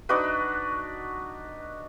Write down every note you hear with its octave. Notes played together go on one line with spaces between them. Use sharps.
D4 D#4 F#4 B4